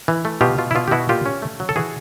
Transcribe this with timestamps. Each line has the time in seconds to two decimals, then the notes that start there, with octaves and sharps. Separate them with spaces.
0.08 E3
0.25 A3
0.41 B2 F4 G4
0.58 B2 F4
0.71 E4
0.75 B2 F4
0.88 G4
0.91 B2 E4 F#4
1.09 A#2 F4 G4
1.26 C#4
1.42 A3
1.60 F#3
1.69 A4
1.76 E3 F#4 G#4